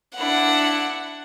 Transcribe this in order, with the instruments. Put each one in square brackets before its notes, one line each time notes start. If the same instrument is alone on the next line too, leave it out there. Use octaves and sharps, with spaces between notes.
[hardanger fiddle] D4 E4 [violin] F#5